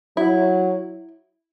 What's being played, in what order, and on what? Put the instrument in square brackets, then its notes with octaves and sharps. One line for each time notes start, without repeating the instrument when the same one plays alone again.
[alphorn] F#3 [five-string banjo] E4